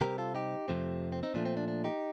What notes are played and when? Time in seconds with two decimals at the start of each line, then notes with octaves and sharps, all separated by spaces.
0.01 C3 G3 C4 G4 A#4
0.18 F4 A4
0.35 D#4 G4
0.68 F2 C3 F3 A3 C4
1.12 C4
1.23 C4 D#4
1.34 A#2 F3 A3 D4
1.45 C4
1.57 D4
1.68 D4
1.84 D#4 G4